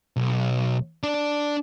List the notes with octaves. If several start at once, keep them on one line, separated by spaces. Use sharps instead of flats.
B1
D4 D5